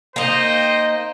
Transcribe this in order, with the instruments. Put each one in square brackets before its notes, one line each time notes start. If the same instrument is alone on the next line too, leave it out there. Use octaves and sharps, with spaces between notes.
[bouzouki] A#3 D#4 [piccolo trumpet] C5 [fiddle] D#5 G5